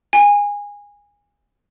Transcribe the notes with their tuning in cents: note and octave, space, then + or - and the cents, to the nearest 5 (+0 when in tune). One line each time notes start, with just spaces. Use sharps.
G#5 -20